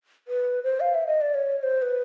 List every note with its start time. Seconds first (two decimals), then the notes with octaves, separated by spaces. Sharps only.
0.28 B4
0.64 C5
0.80 F5
0.94 E5
1.07 D#5
1.21 D5
1.35 C#5
1.59 C#5
1.63 C5
1.82 B4